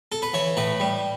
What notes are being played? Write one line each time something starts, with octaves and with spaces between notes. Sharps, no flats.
A4
B4
E3 C#5
A2 B4
G3